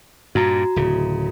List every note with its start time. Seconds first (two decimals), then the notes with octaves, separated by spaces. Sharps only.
0.35 G2 A#2 F#4 A#5
0.76 D1 C#3